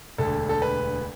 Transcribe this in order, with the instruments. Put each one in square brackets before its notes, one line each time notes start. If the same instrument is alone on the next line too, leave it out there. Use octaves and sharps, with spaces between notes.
[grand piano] E1 D2 D3 A4
A4
B4